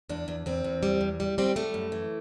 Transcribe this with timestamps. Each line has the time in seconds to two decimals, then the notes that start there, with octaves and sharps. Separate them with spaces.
0.09 E2 D4
0.28 E2
0.46 E2 C4
0.64 E2
0.83 G3
1.01 E2
1.20 G3
1.38 G3 C4
1.56 G3 A3
1.74 F#2
1.92 E3